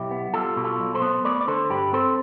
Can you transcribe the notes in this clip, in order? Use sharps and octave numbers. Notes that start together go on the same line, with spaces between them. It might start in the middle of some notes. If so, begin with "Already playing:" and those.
Already playing: B1 E4 G4
B3
G3 F4 A4
B2
F4 A4
B1
A4 C5
B3
A3 B4 D5
D5
D3 A4 C5
G2 G4 B4
C4 A4 C5